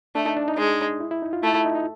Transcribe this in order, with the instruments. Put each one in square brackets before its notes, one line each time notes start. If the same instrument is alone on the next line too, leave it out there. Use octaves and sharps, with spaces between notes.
[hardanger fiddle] A3 [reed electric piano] D4
[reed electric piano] D#4
D4
D#4
[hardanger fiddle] G#3
[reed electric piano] E4
E4
D#4
F4
[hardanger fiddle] A3 [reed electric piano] E4
[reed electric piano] E4
D#4
D#4